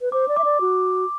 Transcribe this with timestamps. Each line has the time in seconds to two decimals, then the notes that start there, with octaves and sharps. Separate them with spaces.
0.01 B4
0.12 C5 D6
0.28 D5
0.36 E5 D6
0.44 D5
0.61 F#4